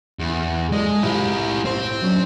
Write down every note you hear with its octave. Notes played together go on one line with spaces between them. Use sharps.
E2
G#3 A4 A#4 D5
A2 C3 E4 F4 G4
C4 C5
F#3 C#4 D4